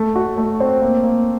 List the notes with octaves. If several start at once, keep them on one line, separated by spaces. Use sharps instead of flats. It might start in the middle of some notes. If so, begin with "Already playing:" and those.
Already playing: A3
F#4
A3
C4
A#3
A#3